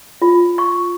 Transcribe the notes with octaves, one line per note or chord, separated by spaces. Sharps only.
F4
C#6